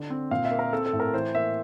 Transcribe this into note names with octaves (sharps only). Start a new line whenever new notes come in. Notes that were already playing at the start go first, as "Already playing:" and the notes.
Already playing: D3
C4
A#2 F5
E5
A#3
A#4
C4 A4
A4
A2
A#4
E3 C5
A#3 E5